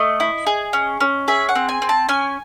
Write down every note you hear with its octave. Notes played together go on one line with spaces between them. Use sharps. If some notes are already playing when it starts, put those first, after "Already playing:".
Already playing: A3 D#5
E4
G#4
C#4
C#4
G#4 E5
F#5
C4
G#5
C4
A5
C#4 G#5